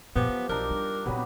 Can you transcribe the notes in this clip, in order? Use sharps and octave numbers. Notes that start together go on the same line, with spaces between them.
G2 A#2 F3 B3 G4
F#3
B1 D4 D#4 A#4
G3
A#2 F#3 G3 B3 C4